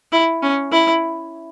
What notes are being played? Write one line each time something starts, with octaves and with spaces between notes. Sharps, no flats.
E4
C#4
E4